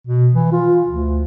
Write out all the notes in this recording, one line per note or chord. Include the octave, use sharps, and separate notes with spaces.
B2
E3
F4
D2